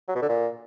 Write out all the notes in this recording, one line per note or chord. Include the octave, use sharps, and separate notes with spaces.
F#3
B2
D3
A#2